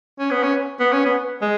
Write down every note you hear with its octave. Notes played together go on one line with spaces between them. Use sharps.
C#4
B3
C#4
B3
C#4
B3
G#3